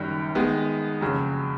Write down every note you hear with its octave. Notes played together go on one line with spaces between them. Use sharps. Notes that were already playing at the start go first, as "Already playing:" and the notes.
Already playing: F#1 F#2 D#3 G3
D#3 G#3 B3
F#1 F2 C#3 F#3